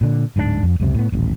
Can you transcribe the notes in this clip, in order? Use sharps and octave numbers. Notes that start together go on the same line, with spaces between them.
A#2 D3
D1 G#2 A3 D4
F2
C#2 F#2 C3
A2 B3
D#1 A1